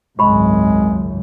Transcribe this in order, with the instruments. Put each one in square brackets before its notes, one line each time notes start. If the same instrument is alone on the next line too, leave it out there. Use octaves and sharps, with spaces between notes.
[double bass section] G#1 C#2 F#2 [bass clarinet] G#3 [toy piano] G4 B5